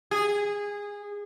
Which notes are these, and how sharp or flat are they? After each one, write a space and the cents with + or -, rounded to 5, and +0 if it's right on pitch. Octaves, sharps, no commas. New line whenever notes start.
G#4 -20